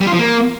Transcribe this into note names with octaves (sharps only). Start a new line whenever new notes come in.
G3
F4
F3
A#3